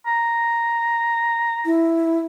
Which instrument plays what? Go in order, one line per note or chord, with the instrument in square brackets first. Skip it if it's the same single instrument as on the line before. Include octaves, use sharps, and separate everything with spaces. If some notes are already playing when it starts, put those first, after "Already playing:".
[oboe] A#5
[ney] E4